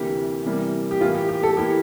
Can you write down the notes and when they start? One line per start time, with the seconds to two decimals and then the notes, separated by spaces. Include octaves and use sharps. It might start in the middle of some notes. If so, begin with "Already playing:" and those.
Already playing: D2 C3 E3 A#3 G4
0.45 C3 E3 G3 A#3
0.91 G4
1.01 A2 E3 A#3 E4 F4
1.15 G4
1.29 G4
1.43 A4
1.57 E3 A#3 E4 G4